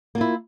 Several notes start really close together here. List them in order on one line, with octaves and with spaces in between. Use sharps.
A#3 F4 E4